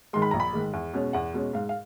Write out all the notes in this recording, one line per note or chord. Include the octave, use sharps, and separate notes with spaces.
G#2 D#3 G#3 C6
B5
A#1 A#5
B5
G#2 D#3 G#3
E2
B2 G#3 C#4
E2 F#5
B2 G#3 C#4
G#2 F5
F5